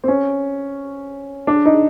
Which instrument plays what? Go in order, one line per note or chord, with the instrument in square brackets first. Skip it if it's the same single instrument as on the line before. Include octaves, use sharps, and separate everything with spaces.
[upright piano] C4
C#4
D4
D#4